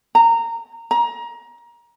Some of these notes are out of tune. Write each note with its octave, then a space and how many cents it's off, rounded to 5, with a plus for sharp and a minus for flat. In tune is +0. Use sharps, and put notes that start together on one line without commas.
A#5 -20
A#5 +20